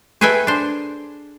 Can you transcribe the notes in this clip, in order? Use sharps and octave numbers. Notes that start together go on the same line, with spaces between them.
G#4 A4 B4 E5 G5 G#5
D4 C5